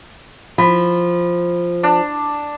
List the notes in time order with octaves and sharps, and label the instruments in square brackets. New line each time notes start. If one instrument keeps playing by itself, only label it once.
[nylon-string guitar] F3 [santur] B5
[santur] D4